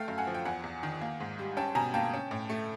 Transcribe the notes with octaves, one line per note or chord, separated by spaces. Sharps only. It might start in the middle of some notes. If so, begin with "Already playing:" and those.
Already playing: A3 F5 G5
F#2
F#5 G#5
F3
G5
E2 F#5 G#5
E2
D#3
A#3
G#2
G3
C#4 G5 A5
B2 G#5 A#5
A#3 G5 A5
C#4
A2
A3